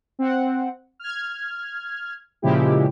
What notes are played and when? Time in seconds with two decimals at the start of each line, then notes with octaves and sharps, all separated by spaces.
0.19 C4 F#5
1.00 F6 G#6
2.42 A#2 C#3 F3 G#3 E4 G4